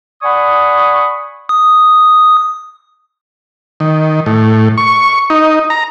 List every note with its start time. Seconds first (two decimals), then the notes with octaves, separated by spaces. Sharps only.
0.23 D5 F#5 G#5 B5 C#6 D#6
1.49 D#6
3.80 D#3
4.26 A2
4.78 C#6
5.30 D#4
5.70 A#5